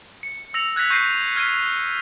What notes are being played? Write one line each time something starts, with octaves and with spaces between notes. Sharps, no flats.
C#7
E6 A#6 C#7 F7
F#6 G#6 A#6 B6 F7
C#6 G6 A#6 C7 D#7
F6 G#6 B6 D#7